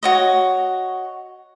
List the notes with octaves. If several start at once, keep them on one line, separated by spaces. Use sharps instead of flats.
F#4 C#5 D#5